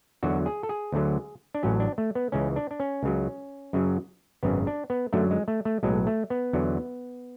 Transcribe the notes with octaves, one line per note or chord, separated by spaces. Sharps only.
E2 D3 F#3 F#4
G#4
A4
G#4
D2 D3 F#3
D4
A1 A2 F#3 C#4
D4
A3
B3
C#2 C#3 E3 C#4
D4
D4
C#4
C#2 C#3 F#3
F#2 C#3 F#3
G#1 F#2 C#3 B3
D4
B3
F#2 D3 F#3 A3
G#3
A3
A3
B1 A2 F#3 G#3
A3
B3
E2 D3 F#3